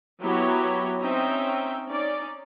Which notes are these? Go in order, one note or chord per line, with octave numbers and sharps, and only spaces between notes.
F#3 B3 E4 F#4 G4 C#5
C4 C#4 D#4 E5 G5 A#5
C#4 D#4 D5